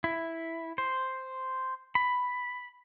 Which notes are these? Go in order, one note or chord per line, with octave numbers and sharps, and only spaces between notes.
E4
C5
B5